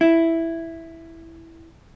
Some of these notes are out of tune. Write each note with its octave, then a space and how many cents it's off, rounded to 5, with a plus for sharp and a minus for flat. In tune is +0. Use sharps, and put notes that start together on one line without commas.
E4 +0